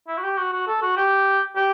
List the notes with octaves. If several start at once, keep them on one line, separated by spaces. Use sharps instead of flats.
E4
F#4
G4
F#4
F#4
A4
F#4
G4
G4